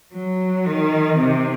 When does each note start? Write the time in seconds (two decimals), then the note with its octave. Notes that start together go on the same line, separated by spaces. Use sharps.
0.14 F#3
0.65 D#3
1.16 C3